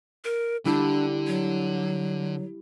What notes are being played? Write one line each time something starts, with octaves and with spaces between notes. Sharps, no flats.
A#4
D3 G3 D4 E4 G4
F#3